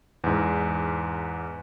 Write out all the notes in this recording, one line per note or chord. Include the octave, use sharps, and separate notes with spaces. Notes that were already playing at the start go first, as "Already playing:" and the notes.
E2 G#2